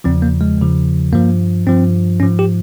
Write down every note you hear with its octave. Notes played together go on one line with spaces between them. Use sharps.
E2 C#3 F3 C4
A#3
G#3
E2 C#3 F3
G2 F3 A#3
G2 F3 C4
G#2 F3 C#4
G4